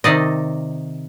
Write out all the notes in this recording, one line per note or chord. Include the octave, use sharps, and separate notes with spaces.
C3 D#3 D5 D#5